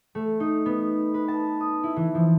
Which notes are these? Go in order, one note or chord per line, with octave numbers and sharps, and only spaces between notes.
A3
D#4
B3
B4
A5
D#6
E4
E3
F3